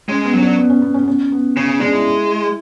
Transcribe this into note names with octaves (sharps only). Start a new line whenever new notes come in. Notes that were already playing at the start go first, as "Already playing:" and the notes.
G#3 C#4
B3
F#3 C#4
D4
B3
C#4
B3
C#4
B3
C#4
B3
C#3 C#4
C#4
G#3 D4
E4